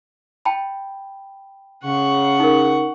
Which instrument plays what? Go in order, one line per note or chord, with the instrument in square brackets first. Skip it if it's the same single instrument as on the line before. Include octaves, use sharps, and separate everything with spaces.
[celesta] G5 A5 B5
[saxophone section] C#3 [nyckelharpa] F#5 C#6
[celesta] D#4 A#4